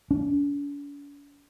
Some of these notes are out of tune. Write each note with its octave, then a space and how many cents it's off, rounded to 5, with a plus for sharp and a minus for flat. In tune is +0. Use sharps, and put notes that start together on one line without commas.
D4 -45